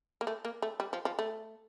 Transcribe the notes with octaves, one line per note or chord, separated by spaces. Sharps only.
A#3
A3
A#3
A3
G3
F3
F3
A3